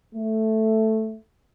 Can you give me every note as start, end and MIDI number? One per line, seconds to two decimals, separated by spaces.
0.15 1.16 57